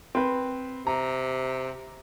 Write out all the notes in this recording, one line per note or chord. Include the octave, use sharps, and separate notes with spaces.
C4 B4
C3 A#5